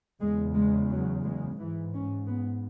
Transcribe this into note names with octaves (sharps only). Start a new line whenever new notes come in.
E2 C#3 G#3
G#3
F#3
G#3
G#2 E3
C#4
B3